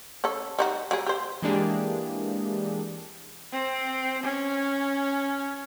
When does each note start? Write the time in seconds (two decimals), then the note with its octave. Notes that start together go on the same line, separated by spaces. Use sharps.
0.24 C#4 A4
0.59 G3 D#4 F#4
0.91 F#3 G3 G#4
1.07 G4 C5
1.42 E3 G#3 A#3 D4 G4 G#4
3.52 C4
4.23 C#4